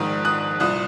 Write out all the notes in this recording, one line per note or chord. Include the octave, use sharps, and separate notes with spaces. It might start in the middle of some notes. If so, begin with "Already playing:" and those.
Already playing: A#1 G#2 D#3 D#6 F#6
D#6 F#6
C2 A#2 D#6 F#6